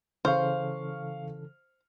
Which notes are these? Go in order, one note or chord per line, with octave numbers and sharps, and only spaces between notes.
C#3 E3 A4 C5 F5 C#6 F6